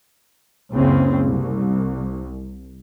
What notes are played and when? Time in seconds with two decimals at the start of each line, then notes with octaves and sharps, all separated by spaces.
0.73 F#1 C#2 F#2 C#3 C4
1.24 C2